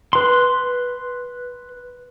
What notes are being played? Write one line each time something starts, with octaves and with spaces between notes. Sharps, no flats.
B4 C6